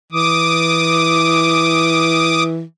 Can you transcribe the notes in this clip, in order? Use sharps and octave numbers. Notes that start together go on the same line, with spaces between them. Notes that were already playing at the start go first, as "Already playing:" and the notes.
E3 D6 D#6